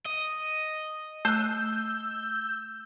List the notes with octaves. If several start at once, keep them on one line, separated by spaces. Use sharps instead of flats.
D#5
A3 E6 F#6 G6